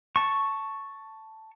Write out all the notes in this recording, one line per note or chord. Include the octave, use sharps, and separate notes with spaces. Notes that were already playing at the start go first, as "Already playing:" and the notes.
A5 C#6